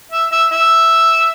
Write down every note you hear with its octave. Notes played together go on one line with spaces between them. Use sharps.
E5
E5
E5